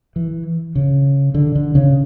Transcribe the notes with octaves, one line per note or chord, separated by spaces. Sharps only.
E3
C#3
D3
D3
C#3